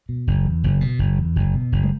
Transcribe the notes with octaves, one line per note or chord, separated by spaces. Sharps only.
B2
F#1
E2
F#1
B2
F#1
E2
F#1
B2
F#1
G#3